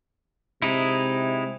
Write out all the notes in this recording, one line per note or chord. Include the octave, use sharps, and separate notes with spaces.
C3 G#3 D#4 E4